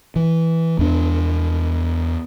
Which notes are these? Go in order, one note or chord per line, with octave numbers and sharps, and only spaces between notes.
E3
E2 D4